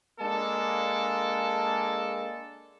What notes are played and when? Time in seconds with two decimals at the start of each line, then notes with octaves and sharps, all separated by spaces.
0.20 G#3 A#3 D4 A4 A5